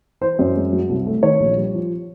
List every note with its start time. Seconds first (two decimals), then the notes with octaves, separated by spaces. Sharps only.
0.21 E3 C5
0.39 F#2
0.56 G#3
0.73 F#3
0.89 C2
1.06 A3
1.23 D#3 C#5
1.40 A#1
1.57 G3
1.75 F3